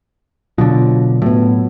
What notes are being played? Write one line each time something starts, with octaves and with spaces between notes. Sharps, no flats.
B2 D3 F#3 F4
A2 F#3 B3